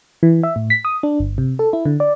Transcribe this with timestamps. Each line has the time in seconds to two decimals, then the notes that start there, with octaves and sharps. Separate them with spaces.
0.23 E3
0.43 E5
0.56 A2
0.70 B6
0.85 D#6
1.03 D4
1.19 G1
1.38 C3
1.59 A4
1.73 E4
1.85 D3
2.00 D5